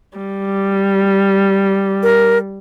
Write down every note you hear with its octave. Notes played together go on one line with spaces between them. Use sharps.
G3
A#4